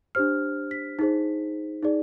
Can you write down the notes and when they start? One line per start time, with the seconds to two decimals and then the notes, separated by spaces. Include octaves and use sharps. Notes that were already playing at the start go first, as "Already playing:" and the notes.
0.15 D4 G4 C5 F6
0.71 B6
0.99 D#4 G#4 C5
1.83 D#4 G#4 D5